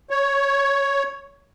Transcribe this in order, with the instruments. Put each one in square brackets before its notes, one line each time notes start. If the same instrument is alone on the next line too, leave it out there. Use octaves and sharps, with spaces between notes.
[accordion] C#5